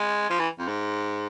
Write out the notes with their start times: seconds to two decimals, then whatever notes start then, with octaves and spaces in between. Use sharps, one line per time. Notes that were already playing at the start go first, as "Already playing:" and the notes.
Already playing: G#3
0.30 F3
0.39 E3
0.59 F2
0.68 G#2